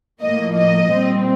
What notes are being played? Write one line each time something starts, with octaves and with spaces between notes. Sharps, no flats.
A2 F3 A#3 D#5
D#5
A#2 G3 C4